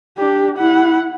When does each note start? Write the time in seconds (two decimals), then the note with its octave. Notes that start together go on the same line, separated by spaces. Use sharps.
0.18 D4 G4
0.57 E4 F#5